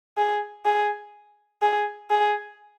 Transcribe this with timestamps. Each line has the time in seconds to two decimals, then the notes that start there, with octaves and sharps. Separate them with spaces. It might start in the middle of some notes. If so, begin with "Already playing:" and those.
0.17 G#4
0.65 G#4
1.62 G#4
2.10 G#4